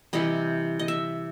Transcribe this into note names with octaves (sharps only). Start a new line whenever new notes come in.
C3 E3 G3 D#5
D#5
E5